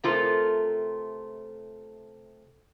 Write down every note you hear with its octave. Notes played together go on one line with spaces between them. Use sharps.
C3 A3 F4 A4 A#4 C5